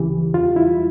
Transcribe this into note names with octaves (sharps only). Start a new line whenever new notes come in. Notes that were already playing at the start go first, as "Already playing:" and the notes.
Already playing: D2 C#3 E3 G4
E2 F4
E4